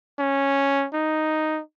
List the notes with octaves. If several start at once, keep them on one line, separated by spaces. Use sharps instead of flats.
C#4
D#4